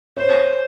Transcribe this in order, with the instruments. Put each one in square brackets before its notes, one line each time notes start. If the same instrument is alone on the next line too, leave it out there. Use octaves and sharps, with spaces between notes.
[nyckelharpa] C5 [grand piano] C#5